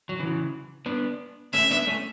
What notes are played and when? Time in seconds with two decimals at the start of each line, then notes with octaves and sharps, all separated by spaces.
0.09 F#3
0.19 C#3 E3
0.86 B3 D4
1.53 A3 C#4 E5
1.71 B3 D4
1.87 A3 C#4